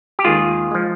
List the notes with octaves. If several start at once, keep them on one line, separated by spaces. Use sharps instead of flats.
G4
D#2 D#3 G#3 F4 G#4
F3 G#3